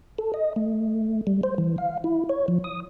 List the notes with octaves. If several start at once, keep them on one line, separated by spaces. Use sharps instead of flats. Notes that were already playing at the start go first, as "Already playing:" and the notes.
A4
D#5
A3
G3
C5
E3
F5
E4
C#5
F3
D#6